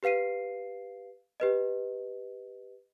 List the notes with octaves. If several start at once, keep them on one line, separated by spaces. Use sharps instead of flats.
G4 B4 F5 C7 D#7
G4 B4 D#5